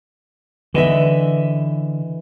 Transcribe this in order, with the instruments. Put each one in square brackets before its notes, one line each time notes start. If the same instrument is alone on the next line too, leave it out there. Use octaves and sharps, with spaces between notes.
[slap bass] D3 [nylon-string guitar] E3 D#5 E5